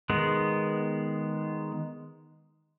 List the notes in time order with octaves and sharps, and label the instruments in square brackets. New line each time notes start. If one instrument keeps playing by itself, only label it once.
[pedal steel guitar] D#3 G#3 B3